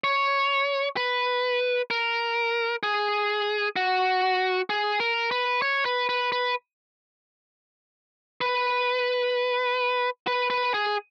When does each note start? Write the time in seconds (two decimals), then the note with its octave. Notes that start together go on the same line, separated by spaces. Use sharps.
0.04 C#5
0.97 B4
1.91 A#4
2.83 G#4
3.76 F#4
4.70 G#4
5.00 A#4
5.31 B4
5.62 C#5
5.85 B4
6.09 B4
6.32 B4
8.41 B4
10.27 B4
10.50 B4
10.74 G#4